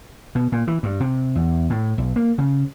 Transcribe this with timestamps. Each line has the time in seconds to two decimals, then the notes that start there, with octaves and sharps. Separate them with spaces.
0.35 B2
0.52 A#2
0.67 E3
0.83 G2
1.00 C3
1.35 E2
1.70 A2
1.98 B1
2.16 A#3
2.38 C#3